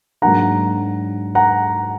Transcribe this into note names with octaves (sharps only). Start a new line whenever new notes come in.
G#2 F#3 A#3 D4 F#5 A#5
F#5 A#5